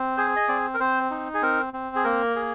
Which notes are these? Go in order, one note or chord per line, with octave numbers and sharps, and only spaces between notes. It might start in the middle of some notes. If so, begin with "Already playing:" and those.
Already playing: C4
G#4 C5
D#5
C4 D5
A#4
C4 C5
D#4
G#4
C4 A#4
C4
G#4
A#3 A#4
G#4